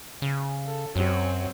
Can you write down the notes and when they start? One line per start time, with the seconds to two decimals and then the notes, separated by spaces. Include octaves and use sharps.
0.22 C#3
0.66 A4
0.96 F#2 F#3 C4